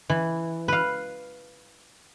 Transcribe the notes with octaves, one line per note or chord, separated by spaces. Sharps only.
E3
B4 F5